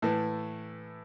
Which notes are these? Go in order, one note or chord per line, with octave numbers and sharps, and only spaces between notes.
A2 E3 A3